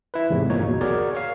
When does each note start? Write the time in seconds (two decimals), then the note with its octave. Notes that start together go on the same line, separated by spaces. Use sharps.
0.14 E4 B4
0.30 E2 G#2 C3 A3
0.50 G1 A#2 A#3 D#4 C#5
0.69 B1 E2 B2 F#3
0.81 F#4 G#4 A#4 C#5 D5
1.15 C#5 F5